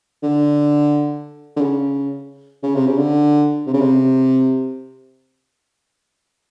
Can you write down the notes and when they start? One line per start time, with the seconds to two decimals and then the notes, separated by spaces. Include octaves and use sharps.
0.23 D3
1.57 D3
1.61 C#3
2.63 C#3
2.75 C3
2.87 C#3
2.98 D3
3.67 C3
3.74 C#3
3.81 C3